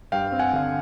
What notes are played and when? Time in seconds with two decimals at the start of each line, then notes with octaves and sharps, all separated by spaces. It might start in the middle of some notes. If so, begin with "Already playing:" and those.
0.12 G2 F5 G5
0.32 C4
0.39 F#5 G#5
0.53 D3 F5